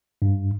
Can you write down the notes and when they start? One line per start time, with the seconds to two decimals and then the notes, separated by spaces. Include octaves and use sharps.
0.22 G2